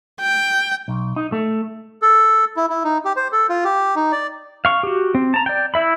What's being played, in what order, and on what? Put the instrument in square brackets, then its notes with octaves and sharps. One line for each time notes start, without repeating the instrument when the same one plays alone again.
[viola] G5
[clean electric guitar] B1
D#4
A3
[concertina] A4
E4
E4
D#4
G4
C5
A4
F4
G4
D#4
D5
[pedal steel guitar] F5 C#6
F#4 G4
C4
A5 A#5
D5 G5
E4 E5 B5